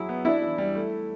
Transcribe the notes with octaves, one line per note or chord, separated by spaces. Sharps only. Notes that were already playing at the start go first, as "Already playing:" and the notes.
Already playing: F#3 E4 G#4
B3
D4 E4
E3
G3
A3